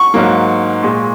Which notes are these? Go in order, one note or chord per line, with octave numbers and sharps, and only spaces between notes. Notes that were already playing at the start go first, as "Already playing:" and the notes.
Already playing: C#6
G#2 F#3 A#3
A#2 G#3